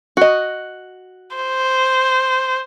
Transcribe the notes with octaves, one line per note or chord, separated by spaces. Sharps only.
F#4 D#5
C5